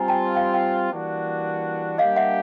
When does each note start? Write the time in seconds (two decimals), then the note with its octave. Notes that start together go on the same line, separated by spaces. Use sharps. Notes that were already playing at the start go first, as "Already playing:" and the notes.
Already playing: G3 C4 F4 G#5 A#5
0.08 G5 A5
0.35 F5 G5
0.54 F5 G5
0.91 E3 G3 A#3 D4 F#4
1.98 G3 A#3 D4 G4 D#5 F5
2.16 E5 F#5